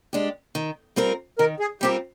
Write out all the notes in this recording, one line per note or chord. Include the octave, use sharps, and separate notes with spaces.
G#3 D4 G4
D#3
G3 C4 F4 A#4
D#3 A#4
G#4
G3 C4 F4 G4 A#4